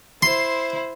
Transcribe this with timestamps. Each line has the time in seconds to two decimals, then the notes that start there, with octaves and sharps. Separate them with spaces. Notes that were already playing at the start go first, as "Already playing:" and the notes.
0.23 E4 C5 C6